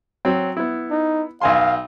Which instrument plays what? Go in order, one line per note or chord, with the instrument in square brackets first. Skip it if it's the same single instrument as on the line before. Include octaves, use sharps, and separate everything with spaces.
[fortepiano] F#3 C4
B3 E4
[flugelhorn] D#4
[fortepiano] B1 G#5 C6 [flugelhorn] F5